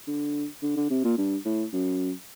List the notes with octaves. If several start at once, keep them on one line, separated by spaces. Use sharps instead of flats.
D3
D3
D3
C3
A#2
G2
A2
F#2